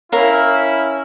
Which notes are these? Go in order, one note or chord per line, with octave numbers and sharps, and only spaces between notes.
C#4 E4 A#4 F5